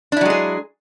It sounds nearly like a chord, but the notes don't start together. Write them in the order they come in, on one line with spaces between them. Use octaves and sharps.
D4 E4 F#3 G#3 G#4